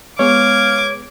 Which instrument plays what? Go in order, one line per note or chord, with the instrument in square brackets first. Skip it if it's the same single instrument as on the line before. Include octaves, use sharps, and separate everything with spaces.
[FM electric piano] G#3 B3 G#4 [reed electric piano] C#5 [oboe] F5 [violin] D6 G#6